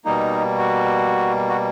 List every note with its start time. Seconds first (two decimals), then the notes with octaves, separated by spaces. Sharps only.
0.05 B2 G3 A#3 D#4
0.58 F#4
1.49 F#4